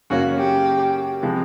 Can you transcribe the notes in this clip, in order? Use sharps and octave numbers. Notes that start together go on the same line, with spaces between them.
F#2 C#3 F#3 A#3 C#4 F#4
G4
C3 F3 G#3 B3